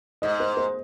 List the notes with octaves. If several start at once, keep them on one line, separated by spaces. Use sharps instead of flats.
G#2 D#5
C5
C5